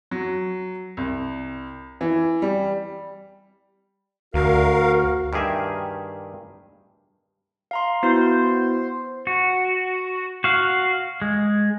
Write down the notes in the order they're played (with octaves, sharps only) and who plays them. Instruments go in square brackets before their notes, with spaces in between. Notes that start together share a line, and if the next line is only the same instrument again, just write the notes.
[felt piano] F#3
C2
E3
G3
[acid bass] D2 [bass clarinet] F#4 [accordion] A#4 F5
[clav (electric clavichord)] G2 D#3 G4 G#4 A#4 E5
[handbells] F5 A#5 C6
[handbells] B3 E4 F#4 [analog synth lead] C5
[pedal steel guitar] F#4
F#4 F5
G#3